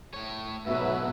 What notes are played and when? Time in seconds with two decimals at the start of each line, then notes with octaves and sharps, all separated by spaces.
0.14 A2 C#5
0.66 B1 G#2 B2 F#3 B3 F#4 B4 E5